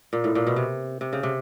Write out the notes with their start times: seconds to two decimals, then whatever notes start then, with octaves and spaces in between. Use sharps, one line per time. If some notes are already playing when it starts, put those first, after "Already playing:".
0.13 A#2
0.24 A2
0.35 A#2
0.47 B2
0.56 C3
1.01 C3
1.13 C#3
1.23 C3